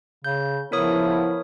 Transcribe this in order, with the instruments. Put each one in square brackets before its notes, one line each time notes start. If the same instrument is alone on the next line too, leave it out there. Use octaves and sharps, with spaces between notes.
[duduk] C#3 [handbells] G6
[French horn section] C#3 B3 E4 [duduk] F3 [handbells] A#4 C#5 D#6